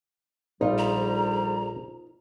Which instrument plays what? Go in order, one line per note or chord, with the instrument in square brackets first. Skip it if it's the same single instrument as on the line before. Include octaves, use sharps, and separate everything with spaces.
[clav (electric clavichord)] A#1 [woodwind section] G#2 D3 G3 [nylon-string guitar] D#4 F4
[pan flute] A#5